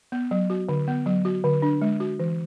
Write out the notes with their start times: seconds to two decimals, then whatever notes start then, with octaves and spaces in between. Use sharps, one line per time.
0.12 B3
0.31 F#3
0.50 F#4
0.69 D3
0.88 B3
1.06 F#3
1.25 F#4
1.44 D3
1.62 D4
1.81 G#3
2.00 F#4
2.20 E3